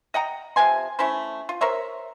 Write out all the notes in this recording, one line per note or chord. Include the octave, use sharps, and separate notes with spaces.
D#5 F#5 G5 A#5
C3 F3 G#5 C6
A3 C#4 E4 C5
F4
A#4 C5 C#5 E5